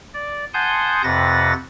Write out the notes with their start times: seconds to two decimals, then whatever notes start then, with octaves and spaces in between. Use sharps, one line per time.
0.14 D5
0.54 F#5 G#5 A5 C6 D#6 G6
1.04 F2 C3 B4 F#5 A6 A#6